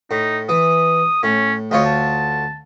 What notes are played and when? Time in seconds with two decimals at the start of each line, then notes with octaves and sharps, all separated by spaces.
0.11 A2 D#4
0.49 E3 D#6
1.23 A2 C#4
1.71 D2 F4 C#5 D#5
1.85 A5